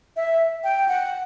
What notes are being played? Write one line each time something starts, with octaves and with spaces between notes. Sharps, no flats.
E5
G5
F#5